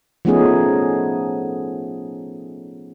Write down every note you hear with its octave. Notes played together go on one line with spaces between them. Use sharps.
F3 A3 B3 C#4 D#4 G#4